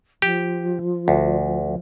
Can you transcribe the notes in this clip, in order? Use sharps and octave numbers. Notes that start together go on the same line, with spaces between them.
F3 G4
D2